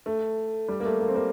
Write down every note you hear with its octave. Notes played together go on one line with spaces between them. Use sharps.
A3
G3
A#3
A3
A#3
C4
G3 A#3